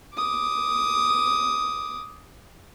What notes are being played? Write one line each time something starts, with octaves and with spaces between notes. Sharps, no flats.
D6 D#6